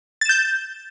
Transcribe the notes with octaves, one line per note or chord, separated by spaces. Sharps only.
G6 A6 E7